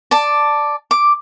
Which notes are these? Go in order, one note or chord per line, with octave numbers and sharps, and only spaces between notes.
D5 A5
D6